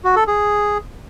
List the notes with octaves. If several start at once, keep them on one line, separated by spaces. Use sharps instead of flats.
F#4
A4
G#4